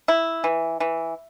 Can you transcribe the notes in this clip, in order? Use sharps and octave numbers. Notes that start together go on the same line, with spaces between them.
E4
E3
E3